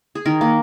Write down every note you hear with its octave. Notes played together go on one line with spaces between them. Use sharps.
G#4
D#3 A#4
A#3